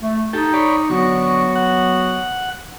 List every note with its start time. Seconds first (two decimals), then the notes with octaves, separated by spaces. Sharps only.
0.01 A3
0.33 D#4 G4 A4
0.53 C#5 D5 B5
0.90 D3 F#3 B3 F#4 C#6
1.56 F#5